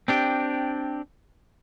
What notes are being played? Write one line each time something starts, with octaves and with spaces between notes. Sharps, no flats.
C4 D4 G4